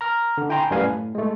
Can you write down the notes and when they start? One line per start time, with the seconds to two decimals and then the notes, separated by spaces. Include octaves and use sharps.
0.01 A#5 F6
0.38 D3
0.49 E4 G5 G#5 A#5 C6
0.71 F#2 G3 A3 B4 F5 G#5
0.83 A2
1.15 G#3 A3